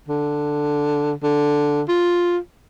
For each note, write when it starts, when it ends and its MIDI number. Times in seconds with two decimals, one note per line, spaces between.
0.08 1.13 50
1.23 1.82 50
1.88 2.38 65